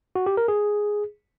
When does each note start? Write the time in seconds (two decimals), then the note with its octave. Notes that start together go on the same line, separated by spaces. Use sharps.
0.15 F#4
0.26 G4
0.37 A#4
0.48 G#4